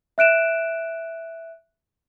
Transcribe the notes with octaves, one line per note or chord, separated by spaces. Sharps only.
E5 F#6 D7 E7